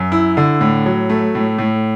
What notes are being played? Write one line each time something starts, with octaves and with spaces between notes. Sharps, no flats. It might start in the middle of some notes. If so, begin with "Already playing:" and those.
Already playing: F#2
E4
D3
A2
F#3
A3
A2
A2